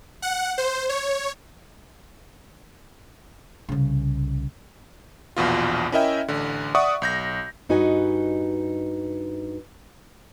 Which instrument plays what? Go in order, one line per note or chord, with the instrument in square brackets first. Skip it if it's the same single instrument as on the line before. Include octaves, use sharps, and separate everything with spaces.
[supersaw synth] F#5
C5
C#5
[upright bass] C2 C#3
[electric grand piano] A#1 E2 B2 F4
C#4 E4 A#4 D#5 E5 G5
A1 D3
D5 E5 F#5 C#6 D#6
B1 G6 A#6
[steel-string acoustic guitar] G2 D#4 F#4 B4 D#5 G#5